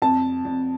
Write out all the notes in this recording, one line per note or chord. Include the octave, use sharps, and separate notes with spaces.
F2 A5
F2